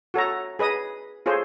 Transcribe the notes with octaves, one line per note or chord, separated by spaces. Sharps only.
F#4 A4 C#5 A#5
G#4 B4 D#5 D#6
F4 G#4 A4 C5 C#5